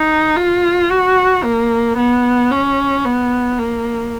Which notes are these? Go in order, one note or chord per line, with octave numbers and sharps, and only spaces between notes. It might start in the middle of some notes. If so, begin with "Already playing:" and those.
Already playing: D#4
F4
F#4
A#3
B3
C#4
B3
A#3